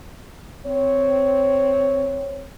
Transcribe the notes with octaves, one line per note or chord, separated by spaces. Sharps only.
C4 C#5